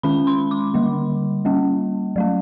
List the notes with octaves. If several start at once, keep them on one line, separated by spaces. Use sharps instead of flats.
D#3 G#3 C#4 B5
C6
D6
D3 G3 A#3
G3 A#3 C#4
F#3 A3 C#4